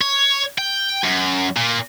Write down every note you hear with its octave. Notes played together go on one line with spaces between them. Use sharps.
C#5
G5
F#2
A#2